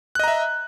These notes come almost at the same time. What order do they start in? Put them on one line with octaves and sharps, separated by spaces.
F#6 D#5 A#5 E5